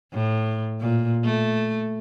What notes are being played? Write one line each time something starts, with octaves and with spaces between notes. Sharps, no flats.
A2
A#2
A3